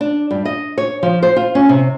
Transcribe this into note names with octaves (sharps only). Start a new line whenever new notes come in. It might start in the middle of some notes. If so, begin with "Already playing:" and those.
D4
G2
D#5
C#5
F3
C5
F4
C#4
C3